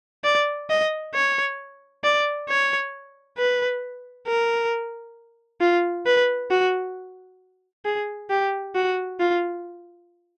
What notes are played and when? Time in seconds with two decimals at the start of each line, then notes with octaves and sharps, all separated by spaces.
0.24 D5
0.70 D#5
1.14 C#5
2.04 D5
2.48 C#5
3.37 B4
4.27 A#4
5.61 F4
6.06 B4
6.50 F#4
7.84 G#4
8.30 G4
8.75 F#4
9.20 F4